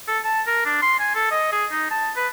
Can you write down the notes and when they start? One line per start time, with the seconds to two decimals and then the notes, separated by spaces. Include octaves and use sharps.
0.07 A4
0.24 A5
0.46 A#4
0.65 D4
0.82 C6
0.99 G#5
1.15 A4
1.31 D#5
1.52 G#4
1.71 D#4
1.90 A5
2.16 B4